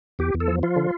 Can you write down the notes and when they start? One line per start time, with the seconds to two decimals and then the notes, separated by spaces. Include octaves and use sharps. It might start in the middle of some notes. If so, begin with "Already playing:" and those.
0.19 E2 G4
0.34 E2
0.40 A4
0.48 F3
0.63 F3 F4
0.76 D3